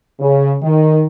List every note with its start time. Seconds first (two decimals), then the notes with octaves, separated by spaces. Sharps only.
0.20 C#3
0.63 D#3